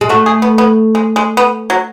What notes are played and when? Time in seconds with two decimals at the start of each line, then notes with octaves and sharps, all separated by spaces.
0.01 G#3
0.09 A3 F#4
0.26 G#4
0.42 B3
0.58 B3
0.95 G#3
1.16 G#3
1.37 B3
1.70 F#3